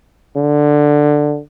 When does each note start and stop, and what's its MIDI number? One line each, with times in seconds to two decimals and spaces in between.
0.37 1.40 50